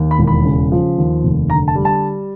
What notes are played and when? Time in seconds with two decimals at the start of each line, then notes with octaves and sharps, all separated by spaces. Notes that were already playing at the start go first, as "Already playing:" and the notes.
Already playing: D#2
0.11 B5
0.19 E1
0.27 B5
0.45 C#3
0.72 F3
0.98 D#2
1.24 F1
1.50 D3 A#5
1.68 A5
1.75 G3
1.85 A5